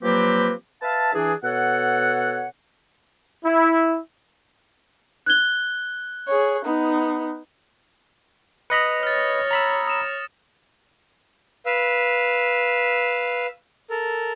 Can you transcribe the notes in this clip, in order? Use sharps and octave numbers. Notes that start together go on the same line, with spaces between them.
F3 F#3 A#3 C4 G4 B4
B4 E5 F5 A5
E3 D4 G#4
B2 A4 C#5 F#5
E4
F#6 G#6 G7
G#4 C#5
B3 D#4
B4 D#5 B5 D#6 A#6 C#7
C#5 F6 A6
A#5 B5 E6
D#6 E7
B4 F5 E6
A4 A#4